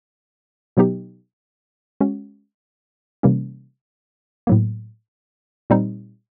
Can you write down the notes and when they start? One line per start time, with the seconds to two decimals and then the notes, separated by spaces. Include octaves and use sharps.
0.77 B2 F#3 B3 D#4 G4
2.01 G#3 C#4 F#4
3.23 C3 E3 G3 A#3 C#4
4.47 A2 F#3 A#3
5.70 A#2 G3 C4 D#4